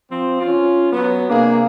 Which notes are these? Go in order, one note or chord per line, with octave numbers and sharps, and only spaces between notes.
F3 C4
C#4 F4
F#3 B3
C3 A#3 D4 G#4